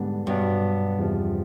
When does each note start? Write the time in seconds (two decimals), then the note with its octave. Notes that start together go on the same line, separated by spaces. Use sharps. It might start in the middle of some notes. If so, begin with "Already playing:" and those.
Already playing: G#2 D3 G3 B3 D4
0.27 G2 B2 F#3 B3 D4
0.98 E2 C3 F3